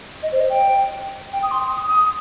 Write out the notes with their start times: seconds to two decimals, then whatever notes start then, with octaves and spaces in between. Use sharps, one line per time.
0.23 D#5
0.32 C5
0.40 D#5
0.50 G5
1.33 G5
1.43 D#6
1.51 C6
1.71 D#6
1.88 D#6